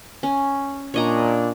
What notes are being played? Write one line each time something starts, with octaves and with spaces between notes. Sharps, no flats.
C#4
A#2 D4 C#5 D#5 A#5